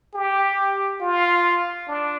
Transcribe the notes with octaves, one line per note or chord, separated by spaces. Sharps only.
G4
F4
D4